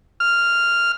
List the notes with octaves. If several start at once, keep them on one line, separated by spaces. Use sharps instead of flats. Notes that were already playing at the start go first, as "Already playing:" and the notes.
F6